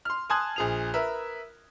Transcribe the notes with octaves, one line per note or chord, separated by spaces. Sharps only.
C6 F6
G#5 A5 C6 D#6 F#6 G#6
A#1 G#4 F7
A#4 B4 E5